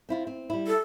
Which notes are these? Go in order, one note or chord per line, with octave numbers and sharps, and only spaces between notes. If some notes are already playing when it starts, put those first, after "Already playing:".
C4 E4 F4
C4
G3 E4
A4